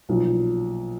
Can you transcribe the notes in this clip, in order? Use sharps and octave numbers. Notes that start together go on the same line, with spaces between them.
B1 A#2 F3